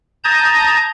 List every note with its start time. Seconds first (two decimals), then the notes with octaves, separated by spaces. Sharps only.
0.24 A5 A#5 D#6 G6 G#6